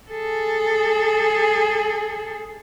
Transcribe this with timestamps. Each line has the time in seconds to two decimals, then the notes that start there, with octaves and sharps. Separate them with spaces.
0.10 G#4 A4